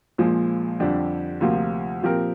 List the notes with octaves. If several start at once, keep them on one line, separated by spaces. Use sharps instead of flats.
A#1 A#2 F3 G#3
F2 D3 G3 D4 G4
D2 C3 F3 A#3 F4
A#2 F3 C4 G4 A#4